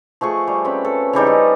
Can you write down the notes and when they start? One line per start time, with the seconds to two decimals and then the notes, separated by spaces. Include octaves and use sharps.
0.21 F3 A3 G#4 C#6
0.48 G3
0.65 C4 C#4 B4
0.85 A4
1.13 C#3 E3 G3 D#4
1.27 D#5